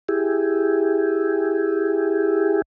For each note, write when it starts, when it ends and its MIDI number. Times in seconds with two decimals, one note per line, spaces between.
0.09 2.62 64
0.09 2.62 67
0.09 2.62 68